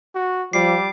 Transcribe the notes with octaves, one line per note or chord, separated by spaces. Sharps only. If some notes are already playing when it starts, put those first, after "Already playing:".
F#4
F3 G3 D6 C7